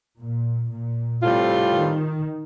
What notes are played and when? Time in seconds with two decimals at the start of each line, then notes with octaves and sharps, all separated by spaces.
0.20 A#2
0.72 A#2
1.23 A2 C3 G3 C4 F4
1.74 D#3